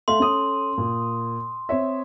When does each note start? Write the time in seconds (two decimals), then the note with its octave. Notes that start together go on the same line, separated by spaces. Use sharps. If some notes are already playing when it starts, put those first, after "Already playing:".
0.08 A3 E5 F5 C6
0.20 C#4 A4 D#6
0.78 A#2
1.69 C4 C#5 E5